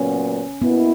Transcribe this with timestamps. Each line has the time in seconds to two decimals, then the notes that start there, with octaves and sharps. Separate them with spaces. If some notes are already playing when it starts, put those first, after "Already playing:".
Already playing: A#2 F#3 B3 C#4
0.61 B2 A#3 B3 E4